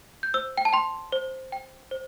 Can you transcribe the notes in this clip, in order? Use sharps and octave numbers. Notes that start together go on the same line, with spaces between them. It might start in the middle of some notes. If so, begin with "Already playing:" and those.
G6
C5 E6
G5
A5
G5 C6
C5
G5
C5